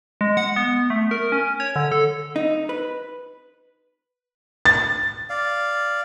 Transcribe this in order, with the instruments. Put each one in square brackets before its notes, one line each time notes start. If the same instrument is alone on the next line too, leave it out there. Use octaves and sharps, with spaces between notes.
[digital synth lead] G#3
F#5
B3
A3
A#4
C#4
C#5
D3
A4
[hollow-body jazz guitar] D#4
B4
[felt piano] A6
[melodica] D5 F5